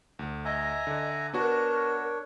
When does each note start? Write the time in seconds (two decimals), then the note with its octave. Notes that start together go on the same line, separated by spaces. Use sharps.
0.19 D2
0.45 D#5 E5 G#5 A#5
0.87 D3
1.34 B3 D4 F#4 A#4 C#5